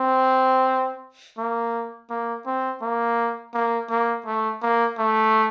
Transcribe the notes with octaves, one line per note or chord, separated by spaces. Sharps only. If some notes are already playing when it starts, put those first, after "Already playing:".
Already playing: C4
A#3
A#3
C4
A#3
A#3
A#3
A3
A#3
A3